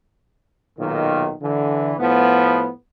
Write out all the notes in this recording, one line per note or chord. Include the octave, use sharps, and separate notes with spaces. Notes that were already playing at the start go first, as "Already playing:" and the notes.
B1 A#2 D#3
D3 E3
A2 F3 B3